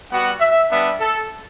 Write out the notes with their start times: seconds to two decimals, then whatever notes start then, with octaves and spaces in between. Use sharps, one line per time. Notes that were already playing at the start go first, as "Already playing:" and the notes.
0.11 G3 B3 F#4 F#5
0.40 E5
0.69 G3 B3 D4 E5
1.00 A4